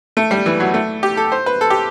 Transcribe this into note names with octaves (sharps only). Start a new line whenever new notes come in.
A3
G3
E3
F#3
A3
G4
A4
C5
B4
A4
G4